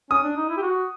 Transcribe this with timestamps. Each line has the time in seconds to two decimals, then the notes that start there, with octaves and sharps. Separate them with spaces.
0.11 C#4 D#6
0.24 D4
0.37 D#4
0.50 E4
0.57 G4
0.63 F#4